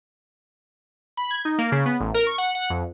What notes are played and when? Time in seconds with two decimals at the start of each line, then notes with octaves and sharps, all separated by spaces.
1.17 B5
1.31 G#6
1.45 D#4
1.58 A#3
1.72 C#3
1.86 B3
2.00 A1
2.14 A#4
2.27 C#6
2.38 F#5
2.55 F#5
2.70 F2